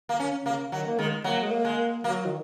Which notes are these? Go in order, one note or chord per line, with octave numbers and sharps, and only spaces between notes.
A#3
C#4
C#3 A#3
D#3 F#3
A#3
D#3 G#3
F#3 A#3
G#3
A#3
G#3
A#3
F#3 A#3
D#3